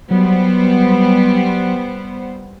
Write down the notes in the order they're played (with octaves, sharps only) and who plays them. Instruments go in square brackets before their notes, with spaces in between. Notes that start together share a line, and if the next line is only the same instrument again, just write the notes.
[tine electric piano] F#3 [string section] G3 B3 C5